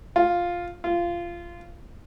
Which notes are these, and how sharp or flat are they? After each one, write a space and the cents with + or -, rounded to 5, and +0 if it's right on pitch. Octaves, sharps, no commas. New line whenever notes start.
F4 +5
F4 -15